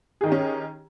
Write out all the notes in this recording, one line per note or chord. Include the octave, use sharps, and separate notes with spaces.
D#3 C#4 D#4 G4 G#4